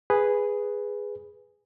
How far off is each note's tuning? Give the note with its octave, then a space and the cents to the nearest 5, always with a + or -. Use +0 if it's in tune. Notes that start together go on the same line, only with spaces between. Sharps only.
G#4 -5 B4 +0